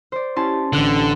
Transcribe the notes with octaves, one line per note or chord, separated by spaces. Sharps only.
C5 D5
C#4 E4 G4 A5 C6
A1 D3 F#6 D7